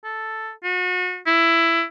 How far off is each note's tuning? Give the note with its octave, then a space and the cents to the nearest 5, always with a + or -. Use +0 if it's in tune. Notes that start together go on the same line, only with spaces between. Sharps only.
A4 +0
F#4 -35
E4 +15